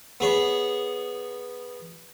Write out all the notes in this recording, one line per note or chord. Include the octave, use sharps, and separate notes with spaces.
B3 G#4 C#5